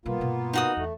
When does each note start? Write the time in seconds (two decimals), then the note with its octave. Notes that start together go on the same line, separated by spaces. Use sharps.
0.05 B2 G3 A#3 B3 F4
0.20 G2 B2
0.53 D#4 F#4 D#6
0.77 E2 A3